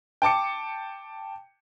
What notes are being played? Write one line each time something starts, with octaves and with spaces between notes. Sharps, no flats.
G5 A5 D6 C#7